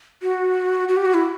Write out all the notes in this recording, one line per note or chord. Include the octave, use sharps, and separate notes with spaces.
F#4
F#4
G4
F#4
E4